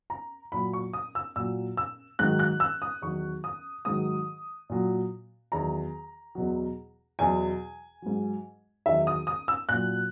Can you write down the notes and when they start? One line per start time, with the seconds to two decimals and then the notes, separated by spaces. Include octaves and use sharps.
0.10 A#5
0.52 A#2 F#3 B5
0.73 C#6
0.93 D#6
1.15 E6
1.36 A#2 F#3 E6
1.77 E6
2.19 G#2 D#3 F#3 F#6
2.39 F#6
2.60 E6
2.82 D#6
3.02 E2 D#3 F#3 C#6
3.44 D#6
3.85 G#2 D#3 F#3 D#6
4.70 A#2 F#3
5.52 E2 D#3 F#3 A#5
6.35 E2 B2 F#3
7.19 E2 B2 F#3 G#5
8.02 G#2 F#3
8.86 E2 D#3 F#3 E5
9.07 D#6
9.27 D#6
9.48 E6
9.69 A#2 F#3 F#6